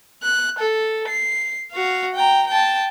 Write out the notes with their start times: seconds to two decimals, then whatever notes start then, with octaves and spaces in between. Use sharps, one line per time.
0.23 F#6
0.59 A4
1.08 C7
1.72 F#4 F5
2.15 G5 A#5
2.48 G5 A5